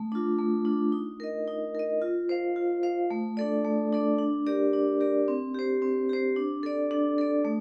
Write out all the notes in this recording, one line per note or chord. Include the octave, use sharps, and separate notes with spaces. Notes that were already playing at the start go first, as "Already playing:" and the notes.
Already playing: A3
D4 F4
A3
D4 F4
D#4
A#4 D#5
D#4
A#4 D#5
F4
C5 F5
F4
C5 F5
A3
D4 A4 D5
A3
D4 A4 D5
D4
G4 A#4 D5
D4
G4 A#4 D5
C4
G4 C5
C4
G4 C5
D4
A4 D5
D4
A4 D5
A3